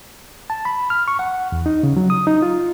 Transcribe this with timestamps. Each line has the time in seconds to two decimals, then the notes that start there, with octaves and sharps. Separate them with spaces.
0.50 A5
0.65 B5
0.90 F6
1.08 C#6
1.19 F#5
1.52 E2
1.66 D#4
1.83 C#3
1.97 F#3
2.10 D#6
2.27 D#4
2.42 F4